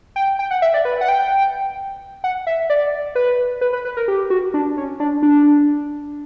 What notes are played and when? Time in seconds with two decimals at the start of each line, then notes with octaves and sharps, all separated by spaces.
0.16 G5
0.39 G5
0.51 F#5
0.62 E5
0.74 D5
0.85 B4
1.01 F#5
1.08 G5
2.24 F#5
2.47 E5
2.70 D5
3.15 B4
3.61 B4
3.73 B4
3.85 B4
3.97 A#4
4.08 G4
4.30 F#4
4.54 D4
4.77 C#4
5.00 D4
5.23 D4